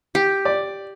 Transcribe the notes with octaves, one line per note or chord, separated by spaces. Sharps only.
G4
D5